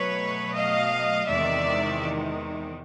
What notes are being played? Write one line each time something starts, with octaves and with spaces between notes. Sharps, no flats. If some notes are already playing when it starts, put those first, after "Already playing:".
Already playing: B2 F#3 A3 B4 C#5
D#5 F5
E2 C3 D#3 G#3 D5 E5